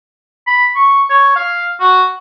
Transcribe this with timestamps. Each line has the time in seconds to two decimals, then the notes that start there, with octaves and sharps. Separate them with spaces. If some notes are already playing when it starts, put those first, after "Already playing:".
0.47 B5
0.75 C#6
1.10 C#5
1.36 F5
1.80 F#4